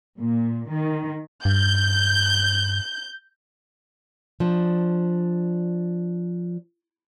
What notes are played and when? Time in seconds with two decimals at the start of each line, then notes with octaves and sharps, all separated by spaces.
0.20 A#2
0.70 D#3
1.45 G2 G6
4.40 F3 D4